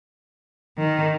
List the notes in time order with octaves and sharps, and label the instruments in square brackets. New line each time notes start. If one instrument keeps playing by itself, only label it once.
[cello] D#3